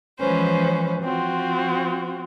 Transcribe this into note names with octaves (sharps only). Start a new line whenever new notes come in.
E3 F3 G#3 C#4 B4 C5
F3 C4 F4 F#4